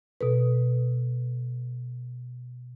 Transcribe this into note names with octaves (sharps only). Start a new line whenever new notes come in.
B2 A4 B4